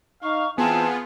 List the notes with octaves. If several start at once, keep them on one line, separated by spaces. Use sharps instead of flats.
D#4 F5 C#6
E3 B3 C4 F4 G#4 A5